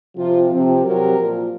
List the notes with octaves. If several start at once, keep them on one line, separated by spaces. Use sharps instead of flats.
C3 F3 F4
C3 F3 C4
C3 F#3 A#4
A#2 F3